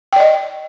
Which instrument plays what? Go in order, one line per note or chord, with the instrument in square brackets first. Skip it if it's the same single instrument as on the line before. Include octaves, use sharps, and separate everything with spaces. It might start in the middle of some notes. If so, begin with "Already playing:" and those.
[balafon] G5
D5
D#5